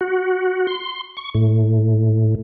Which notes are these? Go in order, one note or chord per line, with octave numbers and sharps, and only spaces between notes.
F#4
C6
C#6
A2